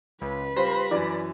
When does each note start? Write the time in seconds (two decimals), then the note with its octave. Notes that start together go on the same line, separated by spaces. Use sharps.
0.22 C#2 B4
0.56 G3 F4 C5 B5 A#6
0.91 F#2 E3 D5